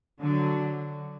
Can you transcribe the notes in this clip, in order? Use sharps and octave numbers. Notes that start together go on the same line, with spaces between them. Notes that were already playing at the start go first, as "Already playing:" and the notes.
D3 F#3